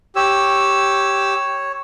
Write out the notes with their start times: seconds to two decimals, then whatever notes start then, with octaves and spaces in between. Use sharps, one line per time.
0.16 G4 C#5 E6